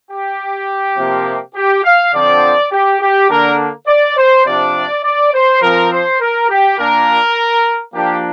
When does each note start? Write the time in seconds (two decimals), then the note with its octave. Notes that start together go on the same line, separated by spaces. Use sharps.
0.10 G4
0.97 C3 F3 A#3
1.55 G4
1.84 F5
2.13 D3 F3 C4 D5
2.72 G4
3.01 G4
3.29 D3 A#3 D4 A#4
3.87 D5
4.17 C5
4.45 C3 F3 D4 D5
5.03 D5
5.33 C5
5.62 F3 C4 A#4
5.91 C5
6.20 A#4
6.49 G4
6.78 A#2 A#3 D4 A#4
7.93 F3 A#3 D4 G4